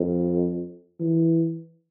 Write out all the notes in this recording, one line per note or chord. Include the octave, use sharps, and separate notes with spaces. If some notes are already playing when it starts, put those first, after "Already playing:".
Already playing: F2
E3